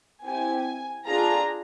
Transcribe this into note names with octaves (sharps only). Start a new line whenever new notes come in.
C4 E4 G4 G#5
D4 F4 G#4 A#5